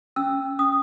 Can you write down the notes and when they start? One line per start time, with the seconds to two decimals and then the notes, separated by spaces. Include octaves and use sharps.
0.16 C#4 E6
0.59 C#4 D#6